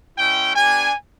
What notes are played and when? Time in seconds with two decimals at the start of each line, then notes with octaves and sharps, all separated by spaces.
0.18 G#3 C#4 E4 G5
0.56 B3 D4 G4 G#5